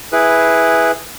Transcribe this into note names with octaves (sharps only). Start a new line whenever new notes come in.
E4 G#4 B4